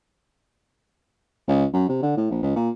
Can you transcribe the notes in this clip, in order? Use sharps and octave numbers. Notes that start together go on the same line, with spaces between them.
C#2
F#2
C3
D3
A2
A#1
C#2
A#2